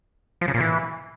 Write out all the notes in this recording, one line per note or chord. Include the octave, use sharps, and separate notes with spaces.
F3
C#3
A#2
E3